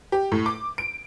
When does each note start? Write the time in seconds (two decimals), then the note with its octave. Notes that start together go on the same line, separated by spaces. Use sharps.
0.12 G4
0.32 A2
0.46 D6
0.78 D7